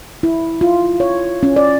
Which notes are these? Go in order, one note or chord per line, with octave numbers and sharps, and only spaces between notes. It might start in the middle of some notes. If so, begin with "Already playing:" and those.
E4
F4
C#5
C#4
D5